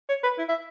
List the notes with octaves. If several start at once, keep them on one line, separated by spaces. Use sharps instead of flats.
C#5
B4
E4
E5